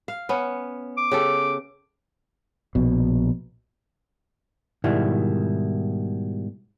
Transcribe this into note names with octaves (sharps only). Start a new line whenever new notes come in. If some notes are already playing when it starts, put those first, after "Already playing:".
F5
B3 C#4
D6
C#3 G4 A4
A#1 B2
G#2 B2 D#3 G3 E4